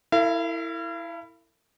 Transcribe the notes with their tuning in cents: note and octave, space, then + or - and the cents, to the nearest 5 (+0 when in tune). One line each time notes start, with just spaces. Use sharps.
E4 +0 A#4 -45 F5 -45